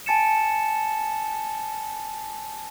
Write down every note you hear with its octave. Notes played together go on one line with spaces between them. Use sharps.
G#5 A5 A6 C#7 E7